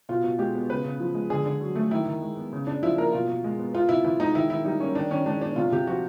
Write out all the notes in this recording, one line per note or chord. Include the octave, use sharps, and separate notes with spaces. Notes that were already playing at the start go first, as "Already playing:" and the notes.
B2 F4
B2
G#3 G4
B3
C#3 B4
C#3
F3
G#3
D3 G#4
D3
F#3
A3
D#3 E4
D#3
G#3
B3
C#3
C#3 D4
F3 E4
A#3 A#4
B2 F4
B2
G#3
B3
B3 F4
C3 E4
E3 E4
G#3 D#4
D#3 E4
D#3 E4
G3 D#4
A#3 C#4
D#3 D4
D#3 C#4
G#3 D4
B3 D4
C3 F4
C3 G4
F3 F#4